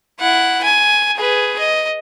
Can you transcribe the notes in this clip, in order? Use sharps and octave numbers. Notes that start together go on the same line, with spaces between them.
E4 F#5
G#5
G#4 B4
D#5